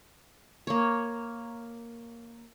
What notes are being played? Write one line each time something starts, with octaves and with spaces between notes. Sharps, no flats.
A#3 C#5